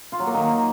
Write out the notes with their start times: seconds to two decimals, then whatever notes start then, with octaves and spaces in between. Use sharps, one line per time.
0.12 F4
0.20 F#3
0.27 A#3
0.34 D#3